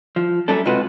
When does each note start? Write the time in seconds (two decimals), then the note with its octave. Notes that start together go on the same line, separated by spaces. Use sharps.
0.16 F3
0.48 F#3 G3 A3 C#4 D4 A4
0.65 B1 C3 G#3 F4 F#4 B4